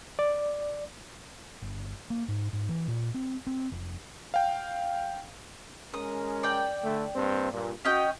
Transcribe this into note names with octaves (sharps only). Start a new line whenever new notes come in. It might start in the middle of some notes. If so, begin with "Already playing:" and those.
D5
G1
A#3
G#2
G#2
E3
A#2
C4
C4
F1
F5 G5
G#3 C#4 A#4 D#6
D5 G5
D3 A3
G2 A#3 C4
G2 A#2
C#4 F#4 D#5 G5